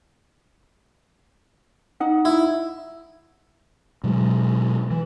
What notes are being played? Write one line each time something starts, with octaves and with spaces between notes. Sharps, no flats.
D#4 F#5
E4
B2 F#3 G#3
E3